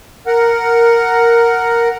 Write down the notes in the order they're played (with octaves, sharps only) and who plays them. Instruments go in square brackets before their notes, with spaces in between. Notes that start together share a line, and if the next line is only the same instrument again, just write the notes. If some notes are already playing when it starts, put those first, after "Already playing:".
[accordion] A#4 F#5